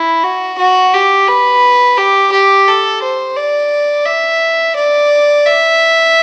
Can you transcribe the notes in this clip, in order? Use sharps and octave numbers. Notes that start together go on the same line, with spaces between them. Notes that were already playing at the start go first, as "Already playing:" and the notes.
Already playing: E4
F#4
F#4
G4
B4
G4
G4
A4
C5
D5
E5
D5
E5